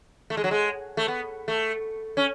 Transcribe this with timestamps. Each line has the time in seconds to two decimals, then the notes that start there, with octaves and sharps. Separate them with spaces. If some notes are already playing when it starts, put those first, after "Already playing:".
0.30 A3
0.37 G#3
0.44 F#3
0.51 G#3
0.97 A3
1.08 B3
1.48 A3
2.17 C#4